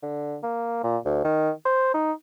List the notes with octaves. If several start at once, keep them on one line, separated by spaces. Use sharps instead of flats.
D3
A#3
A#2
D2
D#3
C5
D#4